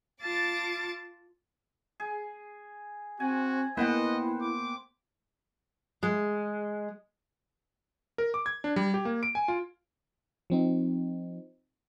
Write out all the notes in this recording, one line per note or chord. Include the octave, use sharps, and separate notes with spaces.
F4 A5 D6 A6
G#4
C4 F#4 G#5
A#3 B3 E4 B4 C5 D#5 F#5 G5
D6
G#3
A#4
D6
G#6
D4
G3
G4
A#3
D7
G#5
F4
F3 C4 D#4